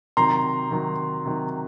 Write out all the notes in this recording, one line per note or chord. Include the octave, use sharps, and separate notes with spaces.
C3 D#3 F#3 A#5 C6
C3 D#3 F#3
C3 D#3 F#3